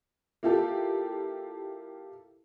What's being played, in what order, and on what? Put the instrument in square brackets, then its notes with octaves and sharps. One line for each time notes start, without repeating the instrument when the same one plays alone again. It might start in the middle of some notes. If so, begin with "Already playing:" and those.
[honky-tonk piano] A#3 E4 F4 G4 A4